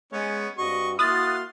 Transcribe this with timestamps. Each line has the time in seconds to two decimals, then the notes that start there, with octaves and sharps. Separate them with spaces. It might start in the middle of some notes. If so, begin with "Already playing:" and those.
0.12 G#3 B3 C#4 C#5
0.58 G2 C4 F#4 D#5 C#6
0.99 A#3 E4 F#4 C6 D#6 F6 F#6 A6